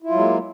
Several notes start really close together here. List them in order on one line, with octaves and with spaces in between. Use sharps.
E4 F4 F#3 G#3 A#3